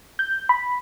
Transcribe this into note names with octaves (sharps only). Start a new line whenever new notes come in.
G6
B5